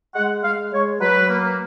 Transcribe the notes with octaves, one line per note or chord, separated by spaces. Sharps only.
G#3 F#5
G#3 F5
G#3 C#5
F#3 B4
A#3